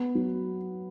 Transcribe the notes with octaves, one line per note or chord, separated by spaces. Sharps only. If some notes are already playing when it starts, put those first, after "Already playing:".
Already playing: B3
F#3